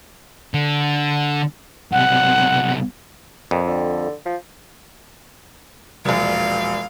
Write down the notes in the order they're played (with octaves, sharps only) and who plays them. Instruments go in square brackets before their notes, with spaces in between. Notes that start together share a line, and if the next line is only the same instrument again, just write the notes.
[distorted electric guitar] D3
[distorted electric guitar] B1 C3 [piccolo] F#5
[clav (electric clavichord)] F2 [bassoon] A#2
[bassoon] D3
F3
[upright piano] E1 A#1 [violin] F5